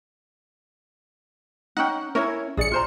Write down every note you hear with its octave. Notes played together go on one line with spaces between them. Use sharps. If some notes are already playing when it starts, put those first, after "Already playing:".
C#4 D#4 F#5 G5
C#4 E4 A#4 C#5
A#1 G#4 D5 C#7
F4 C5 A#5